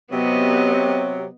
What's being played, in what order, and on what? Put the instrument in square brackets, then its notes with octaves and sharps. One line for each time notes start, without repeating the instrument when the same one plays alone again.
[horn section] C3 F#3 [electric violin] B3 D#5